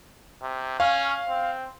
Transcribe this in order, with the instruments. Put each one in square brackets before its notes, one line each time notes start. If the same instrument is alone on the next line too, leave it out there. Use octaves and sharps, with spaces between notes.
[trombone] C3
[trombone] C#4 [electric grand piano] F5
[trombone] C4